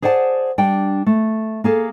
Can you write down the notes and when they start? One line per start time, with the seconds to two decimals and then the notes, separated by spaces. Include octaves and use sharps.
0.02 G#4 C5 D5 F#5 G5 A5
0.58 G3 D4 G5
1.06 A3
1.64 A#3 G#4 A4